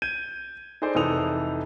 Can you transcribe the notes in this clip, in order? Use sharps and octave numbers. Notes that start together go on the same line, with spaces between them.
G6 G#6 D#7
D#4 G#4 A4 C5 D5 D#5
F1 E3 D#4 A4 D#6 F7